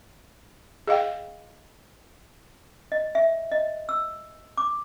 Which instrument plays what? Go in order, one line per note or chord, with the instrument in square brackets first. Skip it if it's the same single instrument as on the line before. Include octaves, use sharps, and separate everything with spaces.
[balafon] G#4 D#5 F5 G5
[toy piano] D#5
E5
D#5
E6
D6